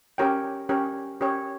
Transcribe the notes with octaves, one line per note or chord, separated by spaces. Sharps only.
C#4 G4 A#4 C#5 G5
C#4 G4 A#4 C#5 G5
C#4 G4 A#4 C#5 G5